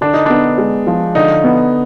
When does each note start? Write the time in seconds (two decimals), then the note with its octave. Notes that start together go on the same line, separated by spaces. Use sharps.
0.01 D3 D4
0.14 D#4
0.26 B3 D4
0.58 G#3
0.87 F3
1.15 D3 D#4
1.44 B3